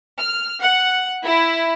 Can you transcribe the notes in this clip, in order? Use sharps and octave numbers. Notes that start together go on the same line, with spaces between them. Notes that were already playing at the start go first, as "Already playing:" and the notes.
F6
F#5
E4